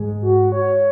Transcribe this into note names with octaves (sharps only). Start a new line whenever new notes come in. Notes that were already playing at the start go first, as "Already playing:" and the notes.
Already playing: G#2 G#3
F#4
C#5